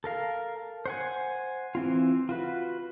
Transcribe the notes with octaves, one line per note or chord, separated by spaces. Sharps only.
A4 A#4 F5
C5 F#5 G#5
E3 C4 F4
F4 F#4 B4